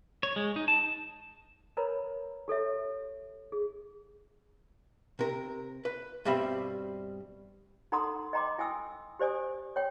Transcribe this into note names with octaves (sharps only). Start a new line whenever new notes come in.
C#5
G#3
D#4
A5
A#4 B4 C#5 A#5 B5
G4 A4 C#5 E5
G#4
C3 A#4
B4
G2 B2 G3 C4 E5 B5
D#4 A4 F#5 A#5 C6 D#6
D#5 G5 A#5 C6 D6
E4 G5 G#5 D#6 E6
G4 C5 D5 G#5 D#6
C#5 G5